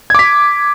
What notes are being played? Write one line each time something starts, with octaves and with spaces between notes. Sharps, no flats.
D6 G#6 B6